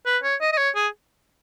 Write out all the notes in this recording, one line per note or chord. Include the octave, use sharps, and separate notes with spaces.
B4
C#5
D#5
D#5
C#5
G#4